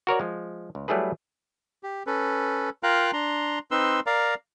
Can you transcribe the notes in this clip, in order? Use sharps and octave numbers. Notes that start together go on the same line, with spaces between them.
F#4 A#4 C#5 D5
F3 G#3
C#2
F#3 G3 A3 E4 G#4 B4
G4
C#4 A4 B4
F4 A#4 F5 G5 A#5 F#6
D4 A#5 C6
C4 D#4 B4 C6 E6
A#4 D5 F5 A#5